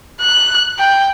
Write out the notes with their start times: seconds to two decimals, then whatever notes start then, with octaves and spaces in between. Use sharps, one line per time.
0.21 F#6
0.79 G5